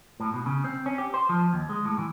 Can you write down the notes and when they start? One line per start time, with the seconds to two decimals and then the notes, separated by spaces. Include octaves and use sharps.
0.20 A2
0.34 B2
0.46 C#3
0.64 C4
0.86 C#4
0.98 G4
1.14 C5
1.29 F3
1.53 D#2
1.69 G#3
1.85 A2
1.99 E3